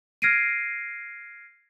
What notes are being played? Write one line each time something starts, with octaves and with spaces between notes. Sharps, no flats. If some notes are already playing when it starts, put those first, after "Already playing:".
F6 G#6 A#6 C7 D7 D#7